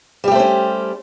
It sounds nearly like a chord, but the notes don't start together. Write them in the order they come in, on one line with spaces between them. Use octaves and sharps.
G3 G4 A3 C5 C#4